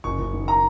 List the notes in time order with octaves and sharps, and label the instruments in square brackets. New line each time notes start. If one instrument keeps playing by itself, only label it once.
[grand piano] F#1 C#6
F#1
D#3
A#5